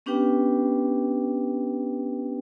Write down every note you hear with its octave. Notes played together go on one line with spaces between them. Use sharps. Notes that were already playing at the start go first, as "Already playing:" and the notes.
B3 C#4 D4 G4 B4 G5